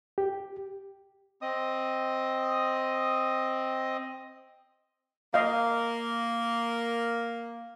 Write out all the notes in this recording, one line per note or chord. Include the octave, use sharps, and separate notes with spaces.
G4
C4 D#5 D#6
A#3 D#5 F5